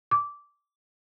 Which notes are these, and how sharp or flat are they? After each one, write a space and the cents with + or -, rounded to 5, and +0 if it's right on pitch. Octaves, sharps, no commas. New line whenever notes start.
D6 -15